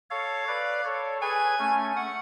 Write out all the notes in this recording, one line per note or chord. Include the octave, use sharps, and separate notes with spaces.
A4 C#5 F5
B4 D5
A4 C#5
G#4 B4 G#5
A3 C#4
F#5